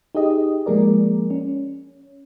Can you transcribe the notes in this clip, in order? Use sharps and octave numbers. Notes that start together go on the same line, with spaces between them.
D#4 G4 G#4 D#5
F3 G#3 A#3 G#4 A#4 D5
C#4